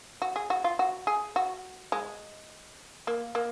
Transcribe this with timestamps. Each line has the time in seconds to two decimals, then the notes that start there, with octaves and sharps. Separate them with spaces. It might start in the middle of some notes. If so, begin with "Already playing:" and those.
0.22 F#4
0.36 G#4
0.50 F#4
0.64 F4
0.79 F#4
1.07 G#4
1.36 F#4
1.92 G#3
3.07 A#3
3.35 A#3